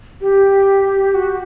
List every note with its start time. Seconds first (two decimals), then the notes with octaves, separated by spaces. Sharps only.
0.21 G4
1.14 F#4